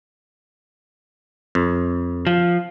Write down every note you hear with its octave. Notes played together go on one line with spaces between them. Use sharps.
F2
F3